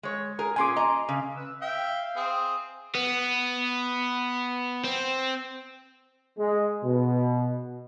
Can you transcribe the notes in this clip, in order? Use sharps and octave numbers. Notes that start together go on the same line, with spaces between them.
G#3 C#5
G#4 A#4
A#2 C#4 G#4 G#5 C6 D6
D#5 A#5
C#3
B4 E6
E5 F5 G5
C4 G#4
B3
C4
G#3
B2